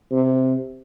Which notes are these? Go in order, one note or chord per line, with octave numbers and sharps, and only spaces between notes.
C3